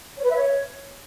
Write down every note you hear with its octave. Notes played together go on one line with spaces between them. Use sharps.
C#5
B4
E5
C#5